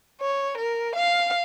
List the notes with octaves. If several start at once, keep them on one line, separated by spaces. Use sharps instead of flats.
C#5
A#4
F5